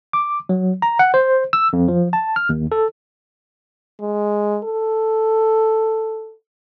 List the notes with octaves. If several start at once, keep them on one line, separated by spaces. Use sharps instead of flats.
D6
F#3
A#5
F#5
C5
E6
F2
F3
A5
F6
D#2
A4
G#3
A4